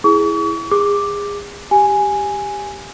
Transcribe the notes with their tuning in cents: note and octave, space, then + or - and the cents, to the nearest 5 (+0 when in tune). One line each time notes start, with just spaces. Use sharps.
E4 +0 G#4 +0 C#6 +40
G#4 -30 D6 +0
G4 +0 G#5 +0